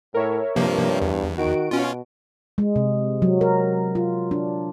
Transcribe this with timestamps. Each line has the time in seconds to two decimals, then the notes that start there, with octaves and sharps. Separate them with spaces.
0.14 A2 A#4 C#5 E5
0.56 G2 C3 F3 A#3
1.01 E2
1.38 D#3 F#4 D7
1.71 B2 C#4 F4
2.58 G#3
2.76 C3
3.22 F#3
3.41 A#4
3.95 F4
4.31 D4